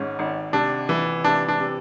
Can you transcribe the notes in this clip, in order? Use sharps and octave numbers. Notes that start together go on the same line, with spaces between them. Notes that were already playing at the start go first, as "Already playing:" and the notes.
Already playing: G#1 G#2 C#4
G#1
C3 D4
E3
C3 D4
D4
C3